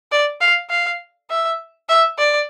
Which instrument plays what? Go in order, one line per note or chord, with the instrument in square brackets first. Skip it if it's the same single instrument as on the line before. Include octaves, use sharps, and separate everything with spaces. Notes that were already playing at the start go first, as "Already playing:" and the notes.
[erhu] D5
F5
F5
E5
E5
D5